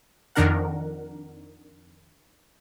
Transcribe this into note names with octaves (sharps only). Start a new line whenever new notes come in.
F2 D#3 D4 A#4 F#5